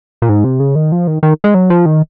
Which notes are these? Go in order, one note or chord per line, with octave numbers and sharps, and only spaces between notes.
A#2
G#2
C3
C#3
D#3
F3
D#3
D#3
G#3
F#3
F3
D#3